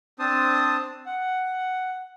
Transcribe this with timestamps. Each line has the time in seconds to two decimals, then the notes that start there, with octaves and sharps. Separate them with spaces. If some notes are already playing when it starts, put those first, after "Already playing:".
0.19 C4 D4 C5 A5 D#6
1.06 F#5